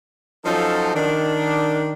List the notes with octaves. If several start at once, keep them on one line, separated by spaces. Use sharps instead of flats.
F3 F#3 C#4 D#4 F4 A4
D#3 D4